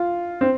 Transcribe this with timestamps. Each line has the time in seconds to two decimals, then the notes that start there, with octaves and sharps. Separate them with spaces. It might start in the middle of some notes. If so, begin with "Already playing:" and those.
Already playing: F4
0.41 C4